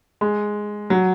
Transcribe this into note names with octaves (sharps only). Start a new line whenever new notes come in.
G#3
F#3